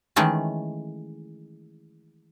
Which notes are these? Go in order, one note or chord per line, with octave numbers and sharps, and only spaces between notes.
D#3 E3 G#3 A3 C#4